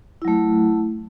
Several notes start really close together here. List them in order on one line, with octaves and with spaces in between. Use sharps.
E4 F#3 A3